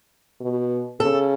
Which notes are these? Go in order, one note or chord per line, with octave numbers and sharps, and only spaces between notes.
B2
C#3 A4